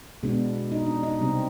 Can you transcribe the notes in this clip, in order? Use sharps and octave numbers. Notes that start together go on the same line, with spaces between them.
B2 G#3 B3 D4
D#4
D4
D#4
C3 G3 C4